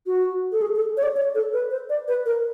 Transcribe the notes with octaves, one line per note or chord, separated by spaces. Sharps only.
F#4
A4
G#4
A4
C#5
D5
C#5
A4
B4
C5
D5
B4
A#4